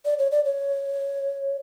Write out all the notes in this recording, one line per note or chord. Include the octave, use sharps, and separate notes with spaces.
D5
C#5
D5
C#5